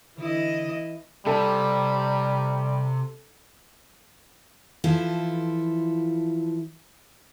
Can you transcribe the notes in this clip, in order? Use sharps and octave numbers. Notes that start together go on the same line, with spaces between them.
D3 E3 E4 D#5
C3 G3 A4
E3 F3 E4 F4 A4